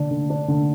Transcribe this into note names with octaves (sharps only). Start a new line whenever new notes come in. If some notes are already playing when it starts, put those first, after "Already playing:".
Already playing: D3 D4
D3
D4
D3